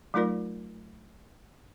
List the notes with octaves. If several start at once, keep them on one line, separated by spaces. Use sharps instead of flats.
F#3 A3 D#4 F4 A#4 D5